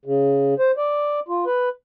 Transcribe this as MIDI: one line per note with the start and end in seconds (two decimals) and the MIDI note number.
0.05 0.54 49
0.59 0.71 72
0.77 1.20 74
1.28 1.45 65
1.46 1.69 71